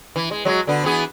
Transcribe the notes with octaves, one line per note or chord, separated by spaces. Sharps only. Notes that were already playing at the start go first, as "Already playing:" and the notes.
E3
G#3
F#3 G#3
D3 B3
E3 B3 G#4